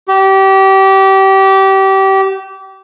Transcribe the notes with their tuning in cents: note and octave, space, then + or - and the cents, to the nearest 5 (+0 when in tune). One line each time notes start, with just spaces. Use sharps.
G4 -25